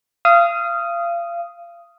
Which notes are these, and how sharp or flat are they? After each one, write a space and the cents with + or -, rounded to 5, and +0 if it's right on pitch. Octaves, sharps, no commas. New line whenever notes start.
F5 -30 D#6 +5